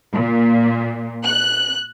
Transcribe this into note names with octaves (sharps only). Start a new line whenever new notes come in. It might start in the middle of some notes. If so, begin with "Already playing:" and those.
A#2
F#6